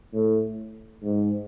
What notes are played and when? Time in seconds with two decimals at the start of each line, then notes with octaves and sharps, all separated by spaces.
0.14 A2
1.03 G#2